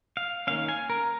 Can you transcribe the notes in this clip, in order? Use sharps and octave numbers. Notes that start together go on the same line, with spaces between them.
F5
D#3 A#3 C#4 F5
G#5
A#4